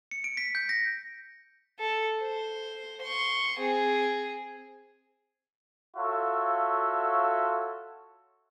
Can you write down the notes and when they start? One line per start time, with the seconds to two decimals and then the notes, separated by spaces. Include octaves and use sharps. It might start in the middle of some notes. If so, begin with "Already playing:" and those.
0.11 C#7
0.24 D7
0.37 B6
0.55 G6
0.69 A#6
1.79 A4
2.21 C5
3.02 C6 C#6
3.59 C4 G#4
5.96 F4 F#4 A4 C#5 E5 F5